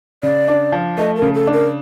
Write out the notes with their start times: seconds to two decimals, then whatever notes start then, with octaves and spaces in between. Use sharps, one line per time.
0.23 C#3 D5
0.48 D4
0.72 F3
0.98 A3 D#5
1.16 A#4
1.22 C#3
1.35 A4
1.47 D4
1.53 A#4